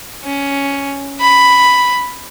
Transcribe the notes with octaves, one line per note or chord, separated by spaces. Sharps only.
C#4
B5